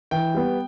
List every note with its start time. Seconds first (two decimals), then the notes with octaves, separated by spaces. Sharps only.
0.11 E3 G5
0.34 G3 B3